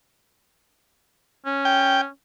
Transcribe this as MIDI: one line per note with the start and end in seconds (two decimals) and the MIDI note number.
1.46 2.08 61
1.65 2.01 79